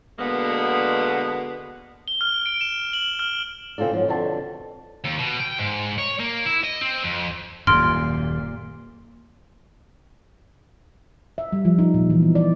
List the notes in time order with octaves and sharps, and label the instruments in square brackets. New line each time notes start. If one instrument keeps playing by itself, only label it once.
[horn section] B2 D3 G#3 A#3 B3
[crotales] G7
F6
D7
E7
F#7
F6
[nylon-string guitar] C#3 C4 F4 A4 D5
G#2 F3 F#3
F2 B2 D3 C4 A5
[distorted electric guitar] D#2
B2
G5
G#2
C#5
A#3
E4
D#5
C4
F2
[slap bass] D#1 F#2 [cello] A#2 [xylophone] C6 F6 D7
[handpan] E5
G3
F3
D#4
A#2
E3
B3
D5